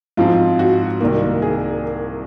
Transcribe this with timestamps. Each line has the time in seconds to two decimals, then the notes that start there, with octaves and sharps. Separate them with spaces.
0.17 G#2 F3 C4 F4
0.59 F#4
1.01 C2 C3 D#3 A#3
1.42 G#4